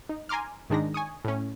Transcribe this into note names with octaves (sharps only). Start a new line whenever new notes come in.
D#4
G#5 A#5 C6 D6 F6
G#2 D#3 G#3 D4 D#4 A#6
G#5 C#6 D#6
A2 C#4